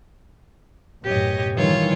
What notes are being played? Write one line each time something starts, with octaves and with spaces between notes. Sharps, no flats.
A1 F#2 B2 G4 C#5 D#5
D#3 E3 G3 F4 C#5